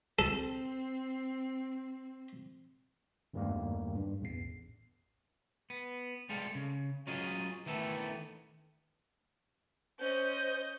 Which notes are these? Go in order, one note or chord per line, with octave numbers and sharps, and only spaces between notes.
C4 A4
E2 G2 D#3 G3 A3 A#3
G2
A1 E2 C7
B3
G3 G#3 A4 F5
C#3
F#3 C#4 F4 G#4 D#5
D#3 E3 A3 B3 A4
C#4 C5 D#5 G6